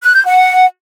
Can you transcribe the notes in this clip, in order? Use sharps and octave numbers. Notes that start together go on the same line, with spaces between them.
F#6
G6
F#5